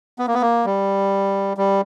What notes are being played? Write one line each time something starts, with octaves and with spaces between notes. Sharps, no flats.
B3
A#3
B3
A#3
G3
G3